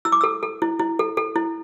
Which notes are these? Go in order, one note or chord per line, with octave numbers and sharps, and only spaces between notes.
E4 E6
D6
A4 E6
A4
E4
E4
A4
A4
E4